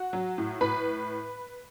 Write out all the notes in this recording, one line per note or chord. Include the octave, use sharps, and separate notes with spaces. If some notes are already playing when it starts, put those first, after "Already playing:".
Already playing: F#4 F#5
F#3
A2
A2 B4 B5